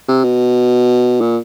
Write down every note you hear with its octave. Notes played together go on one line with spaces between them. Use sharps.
C3
B2
A#2